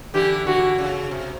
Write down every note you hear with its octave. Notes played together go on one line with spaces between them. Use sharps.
D3 E3 G4
D3 E3 F#4
C#3
C3